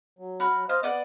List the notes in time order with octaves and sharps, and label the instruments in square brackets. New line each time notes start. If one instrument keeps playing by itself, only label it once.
[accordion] F#3
[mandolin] F#4 B5 F6
[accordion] F#3
[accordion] C5 D#5 F5 [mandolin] F6
[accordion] B3 [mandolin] D5 D#5 F#5